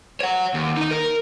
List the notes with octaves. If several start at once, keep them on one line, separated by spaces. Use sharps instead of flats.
C#5 F#5
D#2
D#4 D#5
A#4